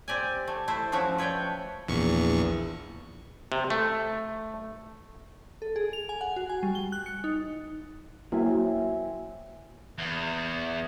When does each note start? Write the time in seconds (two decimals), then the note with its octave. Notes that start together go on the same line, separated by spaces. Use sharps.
0.08 C4 G4 D5 G#5
0.47 A3
0.68 A3 E4 C5
0.92 F3 A3 C#4 F#4 C#5 E5
1.18 B4 C#5 D5 G5
1.87 A#1 E2 C#6
3.52 C3
3.70 A3
5.62 A4
5.76 G#4
5.93 F7
6.09 G#5
6.21 F#5
6.36 F#4
6.49 G#5
6.63 G3
6.75 G7
6.92 F#6
7.06 C#7
7.24 D#4
8.32 F#3 A#3 C4 E4 E5 G#5
9.98 E2